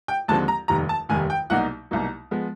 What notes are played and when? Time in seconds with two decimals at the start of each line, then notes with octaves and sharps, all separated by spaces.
0.08 G5
0.28 D#2 D3 F3 G#3 C4 A5
0.48 A#5
0.68 F1 D#2 D#3 G3 A#5
0.89 A5
1.09 F1 D#2 D#3 G3 G#5
1.30 G5
1.50 C2 B2 F#3 A#3 D#4 F#5
1.91 C2 B2 F#3 A#3 D#4
2.31 F3 G#3 B3